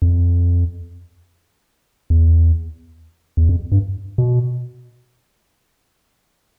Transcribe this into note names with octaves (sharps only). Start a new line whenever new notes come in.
F2
E2
E2
F2
G2
B2